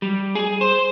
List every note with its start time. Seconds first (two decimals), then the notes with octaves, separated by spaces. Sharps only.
0.02 G3
0.35 G#4
0.61 C5